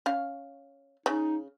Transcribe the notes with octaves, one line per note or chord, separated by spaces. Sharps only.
C#4 F5
C#3 D#4